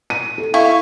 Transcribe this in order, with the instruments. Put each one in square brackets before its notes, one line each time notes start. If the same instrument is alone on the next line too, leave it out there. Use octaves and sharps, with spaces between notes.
[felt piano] D#7
A4
[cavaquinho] E4 [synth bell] F5 C#6